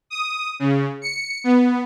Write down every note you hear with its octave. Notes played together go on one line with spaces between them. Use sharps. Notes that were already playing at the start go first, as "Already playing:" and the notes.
D#6
C#3
C#7
B3